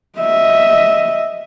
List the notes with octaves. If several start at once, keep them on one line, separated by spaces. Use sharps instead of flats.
D#5 E5